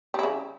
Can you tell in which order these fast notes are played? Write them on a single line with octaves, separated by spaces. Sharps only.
G3 E4 C#3